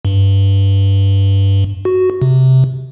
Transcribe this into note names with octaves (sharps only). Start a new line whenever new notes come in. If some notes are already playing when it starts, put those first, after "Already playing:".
G2
F#4
C3